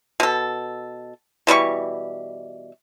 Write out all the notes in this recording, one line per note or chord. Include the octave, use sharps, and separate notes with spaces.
B2 A4
B2 E3 G3 C#6